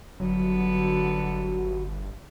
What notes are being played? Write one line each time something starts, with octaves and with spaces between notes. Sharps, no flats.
G1 D3 F#3 B3